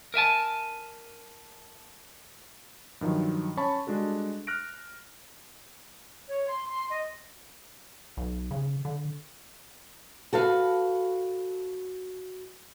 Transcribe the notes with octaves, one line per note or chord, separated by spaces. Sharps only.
A#4 E5 G#5 A5
G2 D#3 F3 F#3
C#4 C#5 A5 B5 C#6
G3 G#3 D4 F#4 A4
F6 F#6 A#6 D7
C#5
C6
C6
D#5
B1
C#3
D3
F#4 A4 B4 F5